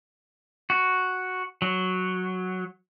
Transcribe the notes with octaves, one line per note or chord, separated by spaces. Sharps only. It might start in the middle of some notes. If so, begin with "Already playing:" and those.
F#4
F#3